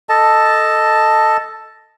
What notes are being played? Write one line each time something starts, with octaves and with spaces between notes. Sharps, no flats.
A4 D#5 A5